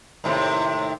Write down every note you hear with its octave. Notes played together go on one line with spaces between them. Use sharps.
D#2 A2 C3